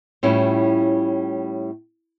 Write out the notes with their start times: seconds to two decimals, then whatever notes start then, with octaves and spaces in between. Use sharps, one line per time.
0.23 A2 G3 C#4 E4 F4